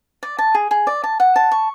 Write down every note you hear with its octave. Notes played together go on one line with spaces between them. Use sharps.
D5
A5
G#4
G#4
D5
A5
F#5
A5
C#6